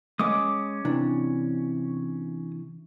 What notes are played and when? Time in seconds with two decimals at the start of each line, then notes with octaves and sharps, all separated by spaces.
0.19 G#3 C#4 D#5 D6 D#6
0.85 C3 E3 D4